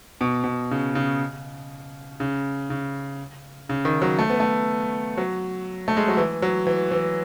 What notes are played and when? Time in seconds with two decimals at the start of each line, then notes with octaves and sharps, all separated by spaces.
0.21 B2
0.44 B2
0.71 C#3
0.95 C#3
2.20 C#3
2.70 C#3
3.69 C#3
3.85 D#3
4.02 F#3
4.19 A3
4.30 B3
4.40 A3
5.17 F#3
5.88 A3
5.97 G#3
6.08 F#3
6.17 E3
6.42 F#3
6.67 E3
6.91 E3